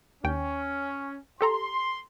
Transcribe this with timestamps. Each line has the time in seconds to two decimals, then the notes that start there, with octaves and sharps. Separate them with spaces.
0.24 D#2 C#4 G5
1.41 G4 A4 A#5 C6